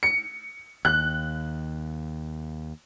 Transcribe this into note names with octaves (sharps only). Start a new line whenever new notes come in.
C#7
D#2 F#6